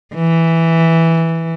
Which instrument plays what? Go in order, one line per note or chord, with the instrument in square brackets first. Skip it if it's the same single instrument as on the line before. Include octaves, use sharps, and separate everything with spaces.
[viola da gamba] E3